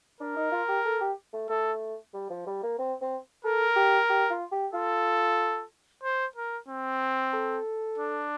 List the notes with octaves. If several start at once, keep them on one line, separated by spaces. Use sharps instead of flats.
D4 A#4
D#4
F4
G4
A4
G4
A3
A3 A4
G3
F3
G3
A#3
C4
C4
A4 A#4
G4
G4
F4
G4
F4 A4
C5
A#4
C4
A4
D4